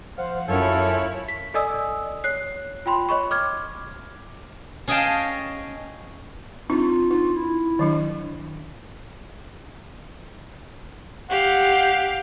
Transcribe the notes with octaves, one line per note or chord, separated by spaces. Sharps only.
F3 C5 F5 F#5
F#2 F#3 C#4 E4 F4 A4 C#5
B6
A4 D5 D#5 G#5 D#6 E6
C#5 F#6 C7
F4 G5 B5 C6
C#5 D#5 B5 C#6
D6 F6 G#6
C#4 G#4 D#5 F5 G5 A5
C4 D4 D#4 F4
D#4 F4
E4
D#3 F#3 D4
G4 F5 F#5